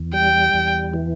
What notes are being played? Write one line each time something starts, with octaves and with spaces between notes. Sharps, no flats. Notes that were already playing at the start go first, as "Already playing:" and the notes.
Already playing: E2
G3 G5
E2
E3